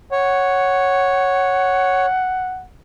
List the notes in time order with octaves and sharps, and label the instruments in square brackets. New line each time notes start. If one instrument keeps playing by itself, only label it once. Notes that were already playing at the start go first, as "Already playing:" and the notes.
[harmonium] C#5 [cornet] F#5